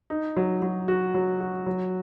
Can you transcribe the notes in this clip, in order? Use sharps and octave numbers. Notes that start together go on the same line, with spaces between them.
D#4
F#3
F#3
F#4
F#3
F#4
F#3